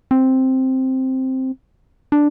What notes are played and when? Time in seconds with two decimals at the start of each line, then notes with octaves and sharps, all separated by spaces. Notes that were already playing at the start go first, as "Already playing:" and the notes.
0.11 C4
2.12 D4